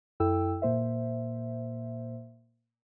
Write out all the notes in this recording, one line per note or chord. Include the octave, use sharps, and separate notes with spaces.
F#2 E4 A4 G5 E6
A#2 A#3 C5 E5